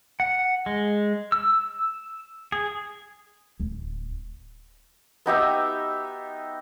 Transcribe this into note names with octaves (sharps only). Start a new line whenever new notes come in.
F#5
G#3
E6
G#4
D1
B3 D#4 G4 E5